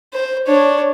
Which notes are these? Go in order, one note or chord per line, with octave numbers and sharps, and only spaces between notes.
C5
D4 C#5